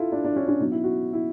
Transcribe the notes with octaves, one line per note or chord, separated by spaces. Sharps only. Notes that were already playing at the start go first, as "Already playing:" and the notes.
Already playing: E4 F4 A4
D4
D4
C#4
C#4
B2 F#3 D#4
E4
F#4
E4